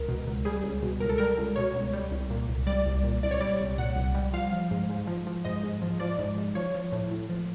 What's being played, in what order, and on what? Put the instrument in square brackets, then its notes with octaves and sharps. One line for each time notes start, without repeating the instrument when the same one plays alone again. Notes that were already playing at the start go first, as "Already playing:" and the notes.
Already playing: [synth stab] C#2 A#4
B2
C#2
G3 G#4
C#2
B2
C#2 A#4
A4
G3 A#4
C#2
B2 C#5
C#2
G3
C2
A#2
C2
G3 D5
C2
A#2
C2 D5
C#5
G3 D5
C2
A#2 F#5
C2
G3
F3 F5
F3
G#2
G#2
F3
F3
G#2 D#5
G#2
F3
F3 D5
G#2
G#2
F3 C#5
F3
A2
A2
F3